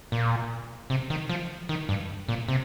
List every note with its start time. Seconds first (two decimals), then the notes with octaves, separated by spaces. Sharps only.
0.12 A#2
0.90 C3
1.10 D#3
1.29 F3
1.69 D#3
1.89 G2
2.29 A#2
2.48 C3